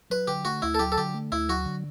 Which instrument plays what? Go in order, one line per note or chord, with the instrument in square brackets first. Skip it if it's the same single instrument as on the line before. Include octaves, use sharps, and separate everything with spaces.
[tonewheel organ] F#3 [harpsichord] B4
[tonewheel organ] D3 [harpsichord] G4
[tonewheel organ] A3 [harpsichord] F#4
[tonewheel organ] D2 [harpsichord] E4
[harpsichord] A4
[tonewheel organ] F#3 [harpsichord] G4
[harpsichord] A4
[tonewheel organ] D3 [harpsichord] G4
[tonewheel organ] A3
[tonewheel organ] D2 [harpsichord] E4
[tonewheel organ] F#3 [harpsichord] F#4
[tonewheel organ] D3